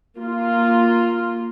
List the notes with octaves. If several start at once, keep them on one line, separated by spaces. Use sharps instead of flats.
A#3 F4